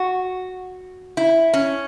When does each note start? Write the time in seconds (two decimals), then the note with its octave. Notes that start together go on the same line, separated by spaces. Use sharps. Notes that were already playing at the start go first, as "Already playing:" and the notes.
Already playing: F#4
1.17 E4
1.53 C#4